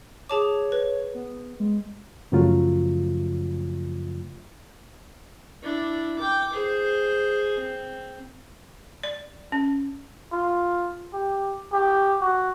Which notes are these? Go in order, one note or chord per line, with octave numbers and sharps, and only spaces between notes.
G#4 C#5 A5 D6
B4
B3
G#3
F#2 C#3 F3 F#3 A3 F4
D4 E4
G5 D6
G#4 C5
C4
D5
C#4
F4
G4
G4
F#4